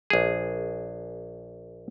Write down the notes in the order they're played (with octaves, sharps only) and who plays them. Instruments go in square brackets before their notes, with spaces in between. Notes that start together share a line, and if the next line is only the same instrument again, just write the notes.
[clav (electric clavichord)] A#1 G#4